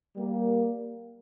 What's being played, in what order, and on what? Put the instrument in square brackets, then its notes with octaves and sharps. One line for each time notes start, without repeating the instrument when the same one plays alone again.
[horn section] G3 A#3